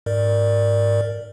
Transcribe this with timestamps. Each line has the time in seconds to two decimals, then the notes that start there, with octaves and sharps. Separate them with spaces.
0.06 G#2 A#4 D5